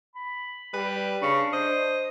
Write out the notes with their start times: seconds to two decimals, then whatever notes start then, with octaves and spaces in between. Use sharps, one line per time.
0.15 B5
0.74 G3 B4
1.22 C#3 D4 C#6
1.53 C5 D#5